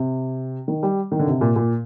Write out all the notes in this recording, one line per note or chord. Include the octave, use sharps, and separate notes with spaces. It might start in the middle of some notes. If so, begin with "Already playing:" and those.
Already playing: C3
D#3
G3
D#3
D3
C3
A#2
A#2